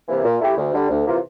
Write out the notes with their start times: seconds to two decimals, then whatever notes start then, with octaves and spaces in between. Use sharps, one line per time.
0.09 C3 E3 A#3
0.24 A#2
0.41 A3 E4 G4
0.57 D2
0.73 D3 G3
0.90 D2
1.05 C3 E3 A#3 F4